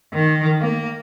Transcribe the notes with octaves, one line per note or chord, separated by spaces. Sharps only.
D#3
A#3